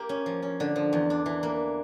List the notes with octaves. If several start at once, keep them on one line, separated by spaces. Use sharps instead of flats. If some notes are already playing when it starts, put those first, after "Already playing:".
Already playing: A#3 G4
C#4
F3
C#4
D3
F3
E2
D4
E3
A#3